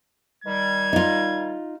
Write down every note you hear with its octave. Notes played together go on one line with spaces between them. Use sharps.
D#3 G3 G#6
D#4 F4